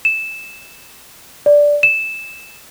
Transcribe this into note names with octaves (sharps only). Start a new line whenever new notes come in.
E7
D5
E7